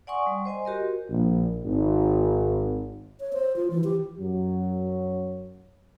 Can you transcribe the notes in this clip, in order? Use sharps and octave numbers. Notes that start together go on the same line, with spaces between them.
D5 F#5 G#5 C6 C#6 D#6
G3
C5 D#5 G#5 C6
F#4 G4 A#4 D#5
A#1
G#1
C#5
C5
F4
E3
G4
F#2 F#3